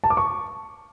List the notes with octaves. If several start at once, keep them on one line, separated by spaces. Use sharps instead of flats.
A5
D6
C#6